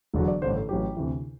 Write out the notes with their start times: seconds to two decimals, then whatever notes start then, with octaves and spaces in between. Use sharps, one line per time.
0.14 E1 E2 D3 F#3
0.28 D5
0.42 A1 G2 D3 C5
0.56 A4
0.69 A1 A2 F#3 G4
0.97 D2 C3 E3